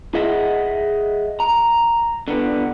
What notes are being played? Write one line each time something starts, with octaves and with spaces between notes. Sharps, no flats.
G#4 D#5 E5 F#5
A#5
D3 B3